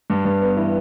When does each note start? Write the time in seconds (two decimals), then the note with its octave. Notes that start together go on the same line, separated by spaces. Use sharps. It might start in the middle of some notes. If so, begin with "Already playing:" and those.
0.10 G2
0.25 G2
0.42 B3
0.57 E3